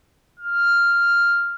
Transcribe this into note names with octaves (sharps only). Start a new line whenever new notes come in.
F6